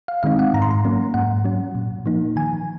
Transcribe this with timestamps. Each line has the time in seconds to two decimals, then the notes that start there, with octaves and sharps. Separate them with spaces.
0.08 F5
0.23 D#3 G#3 C4 D#4 F5
0.39 F#5
0.54 G#2 A#5
0.62 C6
0.71 A#5
0.85 F#3 A#3 C#4
1.14 G#2 F#5
1.44 F#3 C#4
1.75 A#2
2.06 F3 A#3 D#4
2.36 D#3 G#5